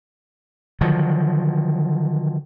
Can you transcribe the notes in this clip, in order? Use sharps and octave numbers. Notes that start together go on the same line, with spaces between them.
D3 D#3 F3 F#3